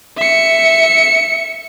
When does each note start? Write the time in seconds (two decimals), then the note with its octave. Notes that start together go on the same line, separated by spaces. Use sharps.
0.17 E5 C#7